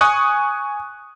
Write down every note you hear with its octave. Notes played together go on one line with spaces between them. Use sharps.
G#5 C#6 D#6 F#6